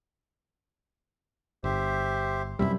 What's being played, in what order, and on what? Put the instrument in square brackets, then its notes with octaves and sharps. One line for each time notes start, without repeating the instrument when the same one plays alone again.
[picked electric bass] G1 [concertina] G4 C5 E5
[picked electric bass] F#2 C3 G3 [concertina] E4 E5